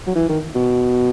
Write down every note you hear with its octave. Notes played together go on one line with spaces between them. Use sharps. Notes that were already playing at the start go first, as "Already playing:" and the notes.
F#3
E3
D#3
B2